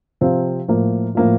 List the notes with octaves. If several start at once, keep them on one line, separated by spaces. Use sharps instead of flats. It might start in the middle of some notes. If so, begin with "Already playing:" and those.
C3 F3 C4 F4
A2 F3 A#3 F4
A2 F3 A#3 F4